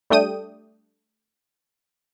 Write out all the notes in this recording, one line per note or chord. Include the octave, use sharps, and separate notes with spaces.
G3 A3 D4 G5 D#6 D#7